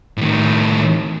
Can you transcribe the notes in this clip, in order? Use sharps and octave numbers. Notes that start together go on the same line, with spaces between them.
A2 D#3